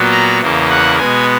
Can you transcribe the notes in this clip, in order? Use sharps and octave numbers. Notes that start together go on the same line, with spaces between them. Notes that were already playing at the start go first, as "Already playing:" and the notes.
Already playing: A#2 F#3 B3
A#5
E2 C#3 E3 A#3
F#5
B2 G#3 B3 G#5